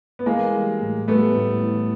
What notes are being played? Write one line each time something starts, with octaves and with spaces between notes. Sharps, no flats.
B3
E3 G#3 A#3
G3
A2
G3 A3 B3
A2
E3